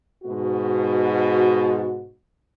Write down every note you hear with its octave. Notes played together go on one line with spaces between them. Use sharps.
G#2 B2 F#4